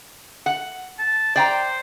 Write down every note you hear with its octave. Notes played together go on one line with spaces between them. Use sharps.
F#5
A5
C5 D5 G5 A#5